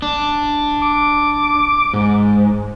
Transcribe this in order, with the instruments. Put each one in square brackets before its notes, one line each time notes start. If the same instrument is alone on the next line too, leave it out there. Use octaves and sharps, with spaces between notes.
[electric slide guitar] D4
[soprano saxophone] D6
[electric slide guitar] G#2